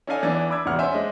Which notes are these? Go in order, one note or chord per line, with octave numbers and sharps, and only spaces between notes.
C#4 D#4 A4 D5 F5 G#5
E2 E3 D4 A6
B5 D6 E6 G#6
E1 A1 E2 F#5 F6
C#4 C5 E5 F#5 G#5
G#3 D4 D#5